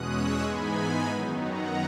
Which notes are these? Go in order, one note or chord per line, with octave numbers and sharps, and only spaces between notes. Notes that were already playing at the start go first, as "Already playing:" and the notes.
Already playing: E2 B2 G#3 C#4 D#6 F#6
C#6 E6
G#2 E3 G#3 B3 D#4 G#5 B5
F#2 D#3 F#3 B3 D#4
F#5 A#5